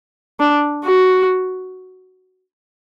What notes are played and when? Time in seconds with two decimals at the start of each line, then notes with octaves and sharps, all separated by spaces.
0.40 D4
0.84 F#4